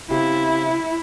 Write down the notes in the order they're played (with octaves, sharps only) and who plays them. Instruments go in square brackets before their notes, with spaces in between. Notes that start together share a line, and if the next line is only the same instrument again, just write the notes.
[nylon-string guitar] C#3 C4 G4 [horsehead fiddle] E4